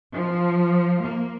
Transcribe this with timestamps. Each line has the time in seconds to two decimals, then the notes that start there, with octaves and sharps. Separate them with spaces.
0.13 F3
1.02 A#3